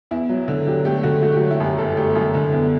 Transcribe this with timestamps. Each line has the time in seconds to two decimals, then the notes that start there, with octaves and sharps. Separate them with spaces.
0.11 E2 E4
0.29 F#3
0.48 D3
0.67 F#3 G4
0.85 A3 G4
1.03 D3 F#4
1.22 A3 F#4
1.32 G4
1.37 F#3 F#4
1.51 E4
1.60 F#2 G4
1.78 G1 A4
1.97 A3 G4
2.15 F#2 E4
2.34 D3
2.52 E2